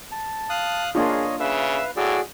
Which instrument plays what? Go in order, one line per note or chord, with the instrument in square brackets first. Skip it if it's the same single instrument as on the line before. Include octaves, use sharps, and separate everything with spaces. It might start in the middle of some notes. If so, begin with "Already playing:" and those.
[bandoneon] A5
[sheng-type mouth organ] F5 D#6 F#6
[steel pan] A#3 D4 F4 [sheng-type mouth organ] G#4 [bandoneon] C#5 D#5
[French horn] C#3 [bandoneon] B4 F5 [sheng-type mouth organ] E5
[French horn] A2 [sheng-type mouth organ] F#4 G#4 D5 [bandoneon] E6